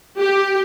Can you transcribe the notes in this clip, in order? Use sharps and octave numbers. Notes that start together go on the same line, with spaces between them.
G4